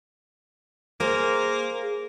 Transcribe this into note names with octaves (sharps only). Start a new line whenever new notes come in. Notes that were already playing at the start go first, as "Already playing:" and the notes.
A#3 G#4 C5